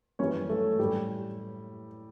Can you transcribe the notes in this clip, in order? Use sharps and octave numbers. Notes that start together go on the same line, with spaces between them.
F#2 E3 G3 C#4 C#5
A3 A4
A2 G3 G4